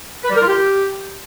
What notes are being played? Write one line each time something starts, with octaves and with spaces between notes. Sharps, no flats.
B4
G3
A#4
F4
G4